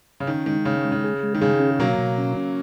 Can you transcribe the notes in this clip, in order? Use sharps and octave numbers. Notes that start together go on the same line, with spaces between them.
C#3
D#3 C#4
D#3 G#3
C#3 C#4
G#3
C#3
G#4
G#3
D#3
C#3 G#4
C#4
B2 F#3 A#3
B2
C#4
C#4